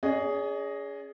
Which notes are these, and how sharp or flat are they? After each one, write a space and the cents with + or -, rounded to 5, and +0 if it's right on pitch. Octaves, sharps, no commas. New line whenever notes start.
C#4 +40 G#4 +0 D#5 +0